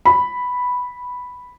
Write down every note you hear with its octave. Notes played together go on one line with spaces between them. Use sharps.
B5